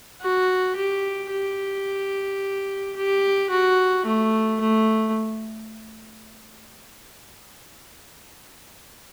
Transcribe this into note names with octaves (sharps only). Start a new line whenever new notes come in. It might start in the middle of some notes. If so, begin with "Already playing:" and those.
F#4
G4
G4
G4
F#4
A3
A3